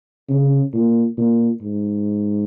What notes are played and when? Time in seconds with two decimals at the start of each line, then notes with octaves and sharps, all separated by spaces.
0.29 C#3
0.73 A#2
1.17 A#2
1.62 G#2